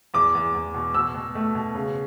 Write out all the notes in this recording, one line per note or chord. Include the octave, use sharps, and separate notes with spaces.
E2 D6
E2
E2
B2
B2 E6
B2
A3
B2
C#3